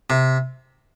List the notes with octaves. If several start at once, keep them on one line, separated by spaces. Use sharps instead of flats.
C3